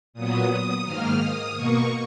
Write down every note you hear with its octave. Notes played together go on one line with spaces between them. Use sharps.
A#2 F#3 B3 D#6
D#6
G#2 D#3 A#3 F6
D#6
B2 A#3 C#6